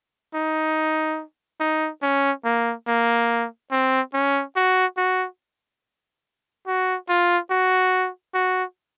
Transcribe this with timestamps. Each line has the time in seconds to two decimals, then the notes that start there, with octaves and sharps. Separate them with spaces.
0.34 D#4
1.60 D#4
2.02 C#4
2.45 A#3
2.87 A#3
3.71 C4
4.13 C#4
4.56 F#4
4.97 F#4
6.67 F#4
7.09 F4
7.50 F#4
8.34 F#4